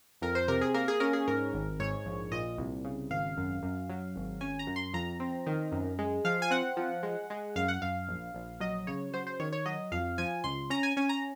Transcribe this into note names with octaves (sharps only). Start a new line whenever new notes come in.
F2 A#4
C5
C3 A#4
G#4
A#3 A#4
G#4
C#4 A#4
G#4
G#2 A#4
G#1
G#2 C#5
A#1
A#2 D#5
C2
C#3
G#1 F5
F#2
F#2
F#3
G#1
C#4 G#5
A#5
F#2
C6
F2 A#5
C4
D#3
F#2
G#3
F3 F5
G#5
C4 F#5
F3
G#3
G#3
F#2 F5
F#5
F#2 F5
A#1
A#1
F#3 D#5
C#3 C#5
F#3 C5
C5
D#3 C#5
C#5
F#3 D#5
F2 F5
F3 G#5
C#2 C6
C#4 A#5
G#5
C#4 G#5
A#5